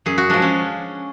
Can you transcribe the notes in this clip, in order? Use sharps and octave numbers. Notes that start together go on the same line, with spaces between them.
F#2 G#4
F#4
F3 G#3 D4
C#4